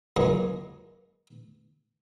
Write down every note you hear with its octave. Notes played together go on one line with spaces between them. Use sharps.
C#2 F#2 A#3 G#4 D#5